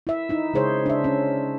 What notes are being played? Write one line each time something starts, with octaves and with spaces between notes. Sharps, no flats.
E4 E5
D#4 E4
C#3 G#3 G#4 C5 C#5
D4 E5
C#4